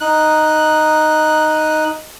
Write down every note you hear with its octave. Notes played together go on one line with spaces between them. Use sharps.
D#4 F#6